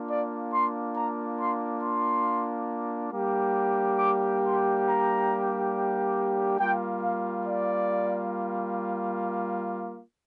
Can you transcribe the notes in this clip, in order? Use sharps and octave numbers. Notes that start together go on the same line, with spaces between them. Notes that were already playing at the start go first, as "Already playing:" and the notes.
Already playing: A#3 D4 F4
D5
C6
A#5
C6
C6
G3 A#3 D4 G4
D6
C6
A#5
G3 A#3 F4 G5
F5
D5